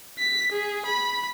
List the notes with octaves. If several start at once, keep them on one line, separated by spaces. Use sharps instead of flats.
B6
G#4
B5